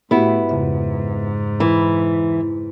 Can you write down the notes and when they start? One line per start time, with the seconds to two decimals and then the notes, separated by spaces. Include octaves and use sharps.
0.11 A2 B3 E4 F#4 G4
0.49 F2 G#2 C#3 E5
1.60 E3 E4